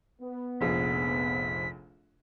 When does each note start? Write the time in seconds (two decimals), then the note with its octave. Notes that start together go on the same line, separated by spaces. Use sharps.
0.22 B3
0.61 F1 A#1 G#4 B6